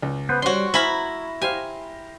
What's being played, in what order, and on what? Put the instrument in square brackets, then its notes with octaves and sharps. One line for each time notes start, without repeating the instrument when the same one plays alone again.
[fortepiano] C#2
[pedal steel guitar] B3 B4 C5
[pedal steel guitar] G3 [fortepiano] C#4 C5 C#5 [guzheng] F#4 C6
[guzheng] E4 B5 [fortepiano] C5 G#5 F6 [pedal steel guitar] A#5
[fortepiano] G4 C5 F5 [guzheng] G#5